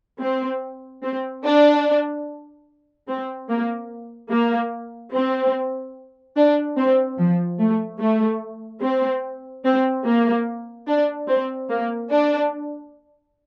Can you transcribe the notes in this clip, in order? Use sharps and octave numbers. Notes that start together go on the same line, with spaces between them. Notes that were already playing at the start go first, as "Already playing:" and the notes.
C4
C4
D4
C4
A#3
A#3
C4
D4
C4
F3
A3
A3
C4
C4
A#3
D4
C4
A#3
D4